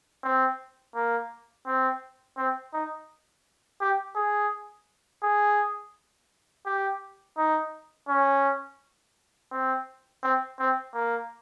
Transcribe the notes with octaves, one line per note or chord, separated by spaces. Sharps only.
C4
A#3
C4
C4
D#4
G4
G#4
G#4
G4
D#4
C#4
C4
C4
C4
A#3